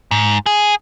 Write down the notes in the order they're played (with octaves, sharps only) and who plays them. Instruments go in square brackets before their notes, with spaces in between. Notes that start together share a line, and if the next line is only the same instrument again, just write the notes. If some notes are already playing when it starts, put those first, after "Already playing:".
[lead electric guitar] G#2
G#4